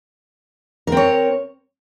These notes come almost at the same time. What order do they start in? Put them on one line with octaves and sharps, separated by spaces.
A#4 C4 C#5